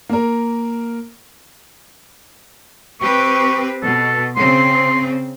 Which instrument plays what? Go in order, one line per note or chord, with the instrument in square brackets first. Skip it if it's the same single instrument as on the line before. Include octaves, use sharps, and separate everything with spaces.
[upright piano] A#3 A#4
[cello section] C4 G4 B4 [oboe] C#6
[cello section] B2 [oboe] A4
[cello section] C#3 C4 [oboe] C6